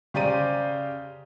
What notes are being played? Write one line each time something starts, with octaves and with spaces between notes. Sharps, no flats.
C#3 G4 C5 D5 A#5 D#7